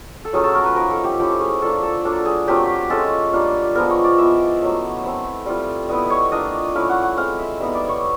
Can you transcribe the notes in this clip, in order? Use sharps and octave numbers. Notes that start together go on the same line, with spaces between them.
A4
F#3 A3 C#4 F4 G#4
A4
A#4
B4
F3 A#3 D#4 A#4
A4
G4
F3 A3 C#4 E4 G4
G#4
A#3 D4 F4 A4
A4
F#3 A#3 D4 F4 A4
G#4
F#3 A3 C4 F4 G4
G#3 C#4 F4 A4
G3 A#3 D4 F4
F3 G#3 B3 A#4
C#5
D5
F3 G#3 B3 E4 E5
F#3 A3 C#4
A3 C4 E4
G3 C4 F4
G3 B3 E4 D#5
C#5
A#3 D4 F4 D#5
A3 C#4 E4 F5
F#5
F#5
G#3 C4 E4 F5
E5
G3 B3 D#4 E5
D5
C#5